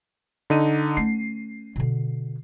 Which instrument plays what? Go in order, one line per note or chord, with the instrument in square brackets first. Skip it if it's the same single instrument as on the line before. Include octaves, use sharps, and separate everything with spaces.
[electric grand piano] D3 D#4 D#7
[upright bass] A3 C#4 [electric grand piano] C7
[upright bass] B2 D3